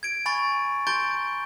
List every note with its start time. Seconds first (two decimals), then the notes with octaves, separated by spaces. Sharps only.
0.03 G#6 D7
0.26 G#5 B5 C#6 G#6 A6
0.87 A#5 C6 G6 A6 D7 G7